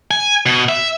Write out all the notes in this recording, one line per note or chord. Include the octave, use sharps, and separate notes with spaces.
G#5
B2
E5